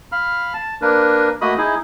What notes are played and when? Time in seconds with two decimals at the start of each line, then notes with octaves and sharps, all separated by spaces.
0.12 F5 B5 F6
0.54 A5
0.82 A#3 D4 A#4 B4
1.41 A3 A#3 F#4 D#5 B5 D#6
1.58 D#4 E4 G#4